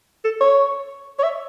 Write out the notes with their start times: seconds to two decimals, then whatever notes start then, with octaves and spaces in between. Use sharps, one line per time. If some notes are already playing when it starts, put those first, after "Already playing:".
0.25 A4
0.40 C#5
1.19 C#5
1.23 E5